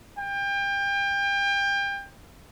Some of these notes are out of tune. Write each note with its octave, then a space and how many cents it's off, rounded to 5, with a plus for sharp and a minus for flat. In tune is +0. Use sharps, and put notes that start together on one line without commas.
G5 +30